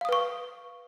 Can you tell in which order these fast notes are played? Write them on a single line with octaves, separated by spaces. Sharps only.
F5 D#6 B4 C#6